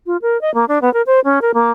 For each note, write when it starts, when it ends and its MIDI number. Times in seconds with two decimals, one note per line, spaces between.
0.06 0.17 65
0.22 0.40 70
0.41 0.53 75
0.54 0.65 58
0.68 0.79 62
0.82 0.92 59
0.94 1.02 70
1.07 1.20 72
1.24 1.39 61
1.42 1.51 70
1.54 1.71 58